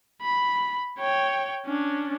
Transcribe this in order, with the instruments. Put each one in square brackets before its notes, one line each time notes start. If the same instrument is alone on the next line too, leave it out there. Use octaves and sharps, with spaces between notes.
[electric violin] B5
C#5 G5
C#4 D4